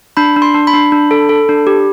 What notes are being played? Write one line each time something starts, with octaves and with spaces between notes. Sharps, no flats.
D4 B5
D4
C6
D4
B5
D4
D4
A4
A4
D4
G4